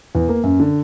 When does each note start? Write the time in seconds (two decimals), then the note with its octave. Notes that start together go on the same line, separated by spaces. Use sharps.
0.15 E2
0.29 A#3
0.43 F#2
0.60 D3